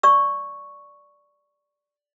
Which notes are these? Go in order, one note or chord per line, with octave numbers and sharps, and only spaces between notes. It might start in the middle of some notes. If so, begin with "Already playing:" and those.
D5 C#6 E6